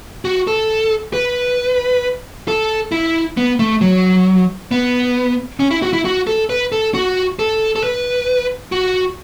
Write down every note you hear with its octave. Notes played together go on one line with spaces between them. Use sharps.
F#4
A4
B4
A4
E4
B3
A3
F#3
B3
C#4
E4
F#4
E4
F#4
A4
B4
A4
F#4
A4
A4
B4
F#4